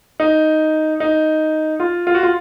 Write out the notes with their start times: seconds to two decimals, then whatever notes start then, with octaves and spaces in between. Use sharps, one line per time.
0.20 D#4
1.00 D#4
1.80 F4
2.07 F4
2.15 F#4
2.23 F4